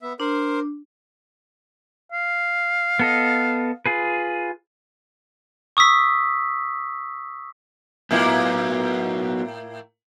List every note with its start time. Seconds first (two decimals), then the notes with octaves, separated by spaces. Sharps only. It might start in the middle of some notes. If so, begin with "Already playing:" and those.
0.02 B3 E5
0.20 D4 A#4 C5
2.12 F5
2.99 B3 A4 D#5
3.86 F4 G#4 B4
5.77 C#6 D#6 E6 B6
8.11 A2 F#3 A#3 B3 E4